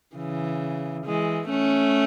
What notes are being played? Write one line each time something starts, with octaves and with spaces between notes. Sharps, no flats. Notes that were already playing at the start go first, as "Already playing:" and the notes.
C#3 E3
E3 G#3
A3 C#4